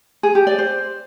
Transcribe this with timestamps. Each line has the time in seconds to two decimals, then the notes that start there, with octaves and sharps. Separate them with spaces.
0.23 G#4
0.35 G4
0.47 D5
0.58 C5